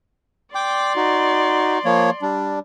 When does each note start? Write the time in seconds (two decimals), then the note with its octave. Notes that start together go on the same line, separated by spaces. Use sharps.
0.55 D5 G5 C6 D6
0.96 D#4 F#4
1.85 F3 A#3 C#5
2.22 G3 D4